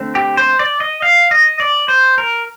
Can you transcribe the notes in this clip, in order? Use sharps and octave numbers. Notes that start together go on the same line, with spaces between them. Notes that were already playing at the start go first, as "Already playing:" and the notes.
Already playing: D3 A3 C4
G4
C5
D5
D#5
F5
D#5
D5
C5
A#4